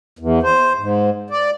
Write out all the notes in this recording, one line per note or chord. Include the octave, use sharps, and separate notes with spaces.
E2
C5
G#2
D5